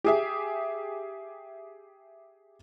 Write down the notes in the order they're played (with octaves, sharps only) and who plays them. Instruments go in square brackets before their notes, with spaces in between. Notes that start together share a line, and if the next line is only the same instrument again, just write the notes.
[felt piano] G4 G#4 E5